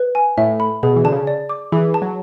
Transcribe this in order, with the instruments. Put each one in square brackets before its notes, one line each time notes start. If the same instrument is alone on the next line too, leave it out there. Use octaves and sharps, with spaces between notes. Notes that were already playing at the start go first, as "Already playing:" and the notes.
Already playing: [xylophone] B4
G#5
[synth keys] A2 [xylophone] E5
[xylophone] B5
[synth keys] B2 [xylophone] G#4
[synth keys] E3
[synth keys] D3 [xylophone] A5
[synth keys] C#3
[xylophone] D5
D6
[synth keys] E3 [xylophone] G#4
[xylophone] A5
[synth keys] F#3